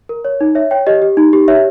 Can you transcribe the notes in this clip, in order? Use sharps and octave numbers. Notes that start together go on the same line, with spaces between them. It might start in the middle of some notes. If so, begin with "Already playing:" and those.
A#4
C#5
D#4
C#5 E5
C#5 G5
G4 D#5
G4
D#4
G4
C#5 E5